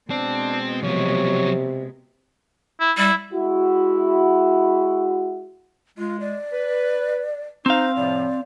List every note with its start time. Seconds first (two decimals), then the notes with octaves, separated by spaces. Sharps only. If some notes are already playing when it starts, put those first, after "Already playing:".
0.10 B2 G#3 C4 D4
0.84 C3 F3 F#3 C#5
2.80 E4
2.97 G3 E4
3.33 G#3 E4 F#4
5.98 G#3 F4
6.20 D5
6.53 B4
7.66 C4 D#4 C5 F5
7.96 A2 C3 F3 D5